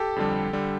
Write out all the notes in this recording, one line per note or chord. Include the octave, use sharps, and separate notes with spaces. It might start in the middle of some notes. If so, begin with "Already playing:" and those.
Already playing: G4 A4
F2 D3 G3
D3 G3